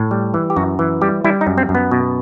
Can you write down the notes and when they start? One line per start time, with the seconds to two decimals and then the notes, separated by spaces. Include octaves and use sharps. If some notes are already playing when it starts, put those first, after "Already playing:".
Already playing: A2
0.11 G3
0.34 E3
0.50 G4
0.56 F#2 F#4
0.79 E3
1.02 G3 G4
1.24 G3 E4
1.41 D#4
1.47 F#2
1.58 C4
1.69 F#2
1.75 B3
1.91 B2